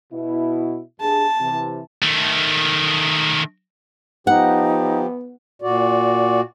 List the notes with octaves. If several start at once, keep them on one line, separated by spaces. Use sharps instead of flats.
B2 E4
G2 G#4 A5
C3 E3
D#3 A3
F3 B3 D#4 G4 F#5
A#2 F#4 D5